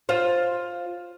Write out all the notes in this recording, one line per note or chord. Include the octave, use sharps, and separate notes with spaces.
F4 C5